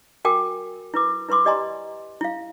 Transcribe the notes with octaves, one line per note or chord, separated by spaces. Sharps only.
F#4 A#4 G5 G#5 D6
E4 B4 D6
E4 B4 B5 C6 D6
G4 D5 D#5 G#5 A#5 C6
E4 F5